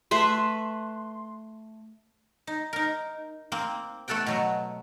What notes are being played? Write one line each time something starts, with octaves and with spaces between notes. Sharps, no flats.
A3 B4 E5 C6
D#4
D#4 A#4
A#3 C4
A3 B3 A4 F#5 G5
B2 F#3 B3